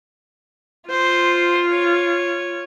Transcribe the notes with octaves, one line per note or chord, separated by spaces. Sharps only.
F4 C5
C#5